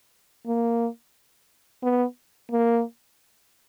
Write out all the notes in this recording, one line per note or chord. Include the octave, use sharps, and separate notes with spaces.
A#3
B3
A#3